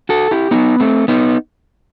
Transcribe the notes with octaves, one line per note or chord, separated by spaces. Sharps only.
F#4 A4
E4 G4
B3 D#4
A3 C4
B3 D#4